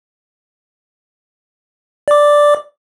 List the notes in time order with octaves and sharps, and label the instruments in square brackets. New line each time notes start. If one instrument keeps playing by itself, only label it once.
[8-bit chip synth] D5 D6